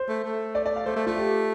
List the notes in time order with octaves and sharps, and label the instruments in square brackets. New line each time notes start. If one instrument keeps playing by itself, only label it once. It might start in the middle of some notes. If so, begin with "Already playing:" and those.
Already playing: [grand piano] C5
[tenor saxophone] A3
A3
[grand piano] D5
D5
F5
[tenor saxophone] A3 [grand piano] C5
[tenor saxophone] A3
[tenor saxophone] A3 [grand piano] F4
[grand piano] G4